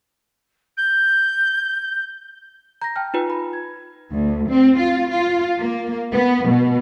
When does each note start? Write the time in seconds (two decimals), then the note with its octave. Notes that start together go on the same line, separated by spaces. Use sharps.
0.77 G6
2.82 A#5 G6 A#6
2.96 G5 A5 F6
3.14 D#4 F4 B4
3.30 B5
3.53 G#6
4.11 D2
4.50 C4
4.80 F4
5.09 F4
5.59 A#3
6.13 B3
6.47 B2